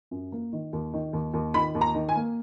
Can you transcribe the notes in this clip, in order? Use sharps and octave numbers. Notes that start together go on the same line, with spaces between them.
F#2
A#3
D#3
D#2
D#3
D#2
D#2
D#3 B5
D#2
A#5
D#3
G#5
A#3